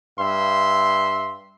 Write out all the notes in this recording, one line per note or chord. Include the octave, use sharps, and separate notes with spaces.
G2 E5 C6